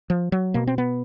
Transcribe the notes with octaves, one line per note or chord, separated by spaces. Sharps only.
F3
F#3
B2 A#3
C4
B3